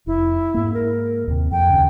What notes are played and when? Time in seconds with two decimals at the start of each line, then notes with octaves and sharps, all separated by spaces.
0.07 F1 E4
0.54 G#2 A#3
0.74 A#4
1.28 D#2 C3
1.52 F2 G5
1.70 D#2 C#3